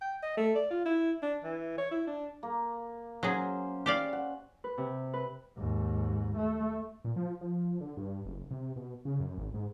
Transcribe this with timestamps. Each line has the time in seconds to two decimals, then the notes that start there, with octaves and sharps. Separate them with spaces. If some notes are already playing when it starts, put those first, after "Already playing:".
0.01 G5
0.22 D#5
0.37 A3
0.55 D5
0.71 F4
0.85 E4
1.22 D4
1.43 E3
1.78 C#5
1.91 E4
2.07 D4
2.43 A#3
3.23 F#3 C#4 G#4 C5
3.86 G4 D5 F5
4.13 F#5
4.64 B4
4.78 C3
5.13 B4
5.57 D#2 G#2
6.37 A3
7.04 A#2
7.16 F3
7.41 F3
7.81 D3
7.97 G2
8.25 F#1
8.51 C3
8.76 B2
9.05 C#3
9.20 F#2
9.38 G#1
9.54 G#2